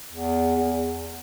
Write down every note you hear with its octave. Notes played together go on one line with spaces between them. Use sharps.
E2
E2